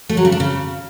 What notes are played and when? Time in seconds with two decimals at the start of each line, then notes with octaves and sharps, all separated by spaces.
0.09 A3
0.17 F#3
0.25 C#3
0.32 D4
0.40 C#3